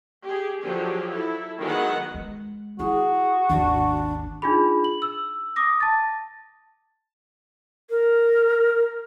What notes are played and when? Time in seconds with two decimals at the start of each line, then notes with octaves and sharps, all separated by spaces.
0.24 G4 G#4
0.60 D3 F3 F#3 G4 G#4
1.12 E4 A4
1.59 D#3 F#3 G#3 B3 F#5
2.14 G#3
2.79 E4 F#4 G#4
3.50 G#1 D#2 D4
4.42 D4 D#4 F4 G#4 B5
4.84 F#7
5.02 E6
5.56 D6 D#6 A#6
5.80 A5 A6
7.90 A#4